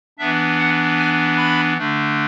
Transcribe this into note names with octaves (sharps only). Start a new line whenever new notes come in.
E3 B3 D4 E5
F#5
G#5
B5
D3 A3 D4